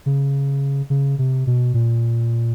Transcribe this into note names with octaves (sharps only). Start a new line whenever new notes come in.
C#3
C#3
C3
B2
A#2